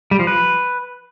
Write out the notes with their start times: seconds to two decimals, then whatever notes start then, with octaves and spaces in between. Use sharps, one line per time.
0.11 G3
0.19 F3
0.27 B4